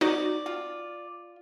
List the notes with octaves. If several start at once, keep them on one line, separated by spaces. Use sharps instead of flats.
D#4 F#4 D5
F4